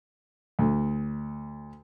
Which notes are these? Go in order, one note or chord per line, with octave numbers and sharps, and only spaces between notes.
D2